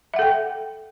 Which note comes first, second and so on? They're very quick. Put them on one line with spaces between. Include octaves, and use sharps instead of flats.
E5 F#5 A4 G5